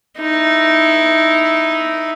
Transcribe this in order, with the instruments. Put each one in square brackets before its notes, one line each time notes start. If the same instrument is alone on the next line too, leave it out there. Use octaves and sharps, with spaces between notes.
[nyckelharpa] D#4 E4